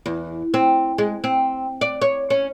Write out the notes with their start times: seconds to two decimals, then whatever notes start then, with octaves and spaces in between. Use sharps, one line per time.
0.06 E2
0.54 C4
0.98 G#3
1.24 C4
1.81 D5
2.01 C#5
2.30 C#4